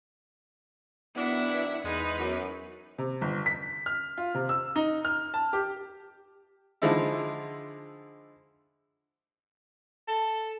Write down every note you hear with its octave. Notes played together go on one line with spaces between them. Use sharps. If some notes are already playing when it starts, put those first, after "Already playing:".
D#3 F#3 B3 D4 E4 E5 F#5
E2 G#2 G#3 D#4 B4
F#2
C3
G1
B6
F6
F4
C3
E6
D#4
F6
A5
G4
D3 F3 G#3 D#4 E4
A4